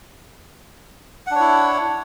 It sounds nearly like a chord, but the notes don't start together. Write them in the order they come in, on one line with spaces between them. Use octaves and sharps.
F#5 D4 C#5 E4